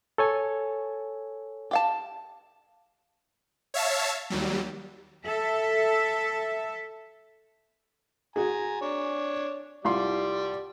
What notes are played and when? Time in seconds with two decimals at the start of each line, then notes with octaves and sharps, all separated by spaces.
0.18 A4 C#5 G#5
1.71 G4 F5 A5
3.74 C#5 E5 F5 A5
4.30 D#2 F#3 G3
5.26 A4 E5
8.36 F#4 G#4 G#5 A#5
8.81 D4 C#5
9.85 C2 G3 F4 D5 C6